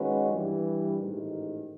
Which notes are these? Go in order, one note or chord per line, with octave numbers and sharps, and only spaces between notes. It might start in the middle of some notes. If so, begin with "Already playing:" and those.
Already playing: D#3 G#3 C#4 F#4 B4
G2 E3 G3
A1 G#2 D#3